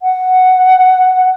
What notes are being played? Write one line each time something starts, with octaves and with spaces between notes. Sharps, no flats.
F#5